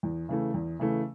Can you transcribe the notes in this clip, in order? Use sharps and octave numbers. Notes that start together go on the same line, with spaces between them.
E2
C#3 E3 A3
E2
C#3 E3 A3